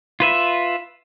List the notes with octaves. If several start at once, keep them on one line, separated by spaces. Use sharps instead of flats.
F4 B4 E5